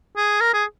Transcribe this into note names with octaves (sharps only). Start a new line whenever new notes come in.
G#4
A#4
G#4